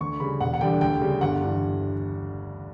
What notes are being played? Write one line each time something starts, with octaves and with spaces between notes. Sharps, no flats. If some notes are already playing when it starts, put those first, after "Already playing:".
D2 C#6
C#3 G3 B5
E1 F#5
F#5
E2 D3 G3 G5
D2 G5
C#3 G3
G1 F#5
G2 E3